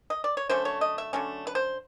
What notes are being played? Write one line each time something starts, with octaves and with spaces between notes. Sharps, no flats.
D#5
D5
C#5
D3 F#3 A3 C#4 C5
C#5
D#5
E5
D3 F#3 A3 C#4
B4
C5